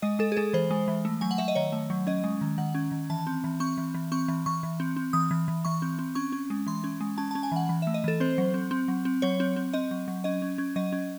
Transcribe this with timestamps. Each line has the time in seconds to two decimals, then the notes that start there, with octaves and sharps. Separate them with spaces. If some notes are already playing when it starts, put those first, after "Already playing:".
0.02 G#3 D#5
0.19 G#3 A4
0.32 G#4
0.37 G#3 A4
0.53 E3 C5
0.71 G#3
0.88 E3
1.05 A3
1.21 F#3 G#5
1.31 F#5
1.38 F#3 E5
1.48 D#5
1.55 D#3 C#5
1.72 A3
1.90 F#3
2.07 C#4 D#5
2.24 G#3
2.41 D#3
2.58 D#3 F#5
2.75 C#4
2.92 D#3
3.10 E3 A5
3.27 C4
3.44 E3
3.60 C4 C#6
3.78 E3
3.94 E3
4.12 C4 C#6
4.28 E3
4.46 E3 C#6
4.63 E3
4.80 C4
4.96 C4
5.13 E3 D#6
5.31 E3
5.48 E3
5.65 E3 C#6
5.82 C4
5.99 C4
6.15 C#4 C#6
6.32 C#4
6.50 G#3
6.67 E3 C6
6.84 C#4
7.00 G#3
7.18 C#4 A5
7.31 A5
7.35 C#4
7.43 G#5
7.52 E3 F#5
7.69 E3
7.82 E5
7.87 A3
7.94 D#5
8.04 E3 A4
8.20 C4 C5
8.38 F#3
8.54 C4
8.71 C4
8.88 F#3
9.05 C4
9.22 F#3 C#5
9.40 C4
9.56 C4
9.73 C4 D#5
9.91 F#3
10.08 F#3
10.24 C#4 D#5
10.42 C#4
10.58 C#4
10.76 F#3 D#5
10.93 C#4